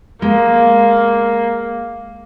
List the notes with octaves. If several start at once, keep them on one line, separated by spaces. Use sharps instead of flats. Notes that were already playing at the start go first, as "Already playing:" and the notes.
G#3 A#3